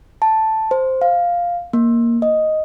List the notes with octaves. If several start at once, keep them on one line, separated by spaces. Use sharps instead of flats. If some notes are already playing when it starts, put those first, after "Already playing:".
A5
C5
F5
A#3
D#5